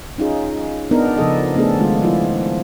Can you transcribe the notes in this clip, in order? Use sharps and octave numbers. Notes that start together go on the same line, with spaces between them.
C#4 D#4 F4 G#4
B3 D4 D#4 A#4
C#3 F3 A4 D#5
A3 B3 D4 G#4 A4
D#3 G#3 F4
F3 E4 F4